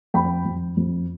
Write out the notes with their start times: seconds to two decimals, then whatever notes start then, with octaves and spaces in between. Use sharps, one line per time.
0.14 F2 G5 B5
0.45 F2
0.77 F2